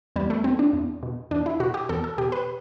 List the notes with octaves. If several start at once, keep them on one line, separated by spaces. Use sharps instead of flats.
E2 G3
A3
B2 C4
D4
E2
B2
E2 D4
E4
B2 F#4
G4
E2 A4
A4
B2 G4
B4